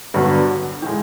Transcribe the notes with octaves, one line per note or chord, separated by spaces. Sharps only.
G2 D3 F#3 B3
A2 E3 G#3